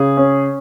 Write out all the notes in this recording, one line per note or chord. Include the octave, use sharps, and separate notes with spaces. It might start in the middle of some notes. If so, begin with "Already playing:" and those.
Already playing: C#3 G#4
C#4